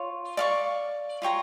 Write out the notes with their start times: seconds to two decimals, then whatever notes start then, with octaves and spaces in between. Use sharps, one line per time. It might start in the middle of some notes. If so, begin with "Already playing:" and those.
Already playing: F4 C#5 F5
0.37 D5 F5 C#6
1.22 F4 C#5 G5 A#5